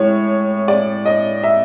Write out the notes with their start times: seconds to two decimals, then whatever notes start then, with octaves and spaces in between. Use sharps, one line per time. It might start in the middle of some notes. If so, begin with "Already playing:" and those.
Already playing: A2 G#3 C#5
0.68 D5
1.05 D#5
1.43 E5